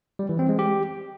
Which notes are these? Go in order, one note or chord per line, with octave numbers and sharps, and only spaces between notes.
G3
E3
C4
G#3
G4